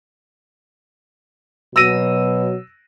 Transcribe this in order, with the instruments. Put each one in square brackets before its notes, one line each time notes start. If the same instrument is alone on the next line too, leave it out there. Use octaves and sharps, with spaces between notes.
[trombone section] B2 F#3 [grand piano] E6 A#6 D#7